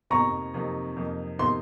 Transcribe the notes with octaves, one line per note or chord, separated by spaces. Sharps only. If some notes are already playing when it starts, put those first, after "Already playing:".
F2 C3 F3 A#3 D#4 A#5 C#6
F2 C3 F3 A#3 D#4
F2 C3 F3 A#3 D#4
C3 F3 A#3 D#4 C6